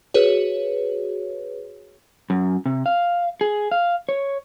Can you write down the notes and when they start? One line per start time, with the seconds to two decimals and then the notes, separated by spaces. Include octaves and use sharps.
0.14 F#4 G#4 B4 C#5
2.30 F#2
2.66 C3
2.86 F5
3.41 G#4
3.72 F5
4.09 C#5